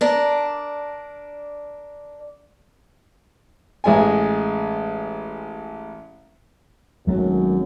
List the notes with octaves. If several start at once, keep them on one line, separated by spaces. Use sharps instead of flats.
D4 A#4
A1 G#3 G#5
G#1 F#2 F#3 A3